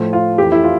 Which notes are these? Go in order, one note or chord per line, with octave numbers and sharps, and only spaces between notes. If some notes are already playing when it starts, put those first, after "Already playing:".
Already playing: A2 F3 A3
F4
F2 E3 A3 G4
E4
F4